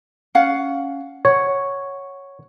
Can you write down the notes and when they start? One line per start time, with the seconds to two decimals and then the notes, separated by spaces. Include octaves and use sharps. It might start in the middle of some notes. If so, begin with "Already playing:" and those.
0.35 C#4 F5 F#5
1.25 C#5 F#5